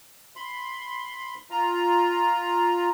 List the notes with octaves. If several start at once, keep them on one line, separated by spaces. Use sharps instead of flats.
B5 C6
F4 A#5